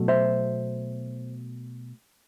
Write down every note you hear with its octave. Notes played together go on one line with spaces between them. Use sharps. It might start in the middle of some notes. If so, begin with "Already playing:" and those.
Already playing: B2 F#3 A3
C5 E5